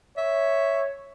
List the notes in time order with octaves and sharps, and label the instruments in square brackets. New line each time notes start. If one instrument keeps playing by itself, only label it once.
[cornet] C#5 [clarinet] E5